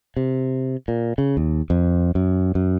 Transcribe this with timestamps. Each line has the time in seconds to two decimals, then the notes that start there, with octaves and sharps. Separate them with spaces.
0.17 C3
0.88 A#2
1.18 C#3
1.37 D#2
1.70 F2
2.15 F#2
2.55 F#2